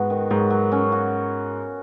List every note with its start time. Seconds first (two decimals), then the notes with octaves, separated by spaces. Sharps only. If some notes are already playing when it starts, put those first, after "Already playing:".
Already playing: G#2 B3 F#4
0.10 D#3
0.30 G#2 F#3
0.50 F#3
0.72 C#4
0.92 F#4